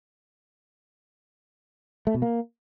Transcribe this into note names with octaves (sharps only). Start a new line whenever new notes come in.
A3
B2
A#3